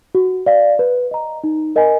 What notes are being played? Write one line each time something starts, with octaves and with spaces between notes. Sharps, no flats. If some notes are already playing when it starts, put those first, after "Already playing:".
F#4
D5 F5
B4
D#5 A#5
D#4
A#4 D#5 G#5